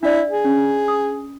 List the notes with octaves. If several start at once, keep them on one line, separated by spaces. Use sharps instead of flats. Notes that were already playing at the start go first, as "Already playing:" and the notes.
D4 E4 D5
G#4
C#4
D#6